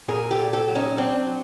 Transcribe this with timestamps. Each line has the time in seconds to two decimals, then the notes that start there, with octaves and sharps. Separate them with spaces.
0.08 A#2 G#4 A#4
0.31 G4 A4
0.39 A#2
0.53 G4 A4
0.68 F#3
0.75 C#4 D#4
0.97 F#3 C4 D4
1.27 F#3